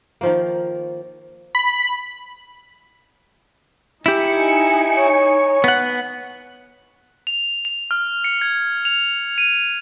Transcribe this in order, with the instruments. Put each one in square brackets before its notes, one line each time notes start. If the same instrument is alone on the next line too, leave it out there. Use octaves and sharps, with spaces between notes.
[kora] D#3 F3 A#3
[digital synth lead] B5
[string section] D#4 G#5 C#7 [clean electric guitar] E4 G4
[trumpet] C#5
[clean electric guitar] B3 F#5
[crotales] F7
F7
F6
C#7
G#6
F7
D#7